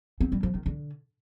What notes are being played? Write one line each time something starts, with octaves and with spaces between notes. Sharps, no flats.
C4
G3
F3
D#3
D3